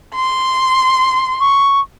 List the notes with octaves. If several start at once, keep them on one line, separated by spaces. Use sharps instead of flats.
C6
C#6